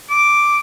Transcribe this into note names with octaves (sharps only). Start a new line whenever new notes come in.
D6